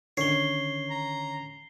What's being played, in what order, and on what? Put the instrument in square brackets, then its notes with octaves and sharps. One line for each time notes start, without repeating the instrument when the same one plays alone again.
[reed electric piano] D3 D#3 C#4 [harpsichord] C#5 [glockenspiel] C7 G7
[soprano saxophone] A#5